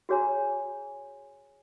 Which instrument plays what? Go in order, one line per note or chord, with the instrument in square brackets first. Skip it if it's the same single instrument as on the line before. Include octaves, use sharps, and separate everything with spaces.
[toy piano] F#4 G#4 C#5 G#5 A#5